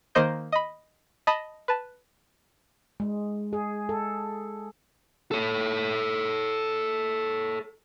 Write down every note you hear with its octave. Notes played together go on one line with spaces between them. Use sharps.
D#3 A#3 C5 D#5 G6
D#5 B5
D#5 A5 B5
B4 A5
G#3
G#4
A4
A4 C#5